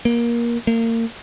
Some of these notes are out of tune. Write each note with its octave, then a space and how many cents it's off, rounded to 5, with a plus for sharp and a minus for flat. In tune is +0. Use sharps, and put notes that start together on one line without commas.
A#3 +20
A#3 -30